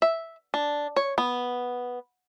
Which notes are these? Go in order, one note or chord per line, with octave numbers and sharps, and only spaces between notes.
E5
D4
C#5
B3